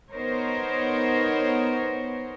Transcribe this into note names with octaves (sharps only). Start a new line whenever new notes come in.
B3 D#4 A#4 C5 C#5